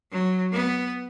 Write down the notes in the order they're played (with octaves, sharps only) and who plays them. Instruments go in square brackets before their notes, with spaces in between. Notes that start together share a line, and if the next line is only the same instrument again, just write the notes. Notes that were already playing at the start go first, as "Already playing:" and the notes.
[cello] F#3
B3